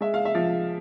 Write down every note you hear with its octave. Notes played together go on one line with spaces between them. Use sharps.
G#3 E5
F5
E5
F3